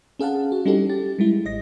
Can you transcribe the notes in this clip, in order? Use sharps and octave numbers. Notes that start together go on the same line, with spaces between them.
C#4 G#4 F5 F#5 A5
F#4
G3 C#4 D#4 E4 G4 A4
G4 A6
G3 G#3 E4
A1 D#5 A#6